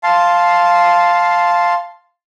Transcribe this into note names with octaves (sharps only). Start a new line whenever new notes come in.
F5 A5 C6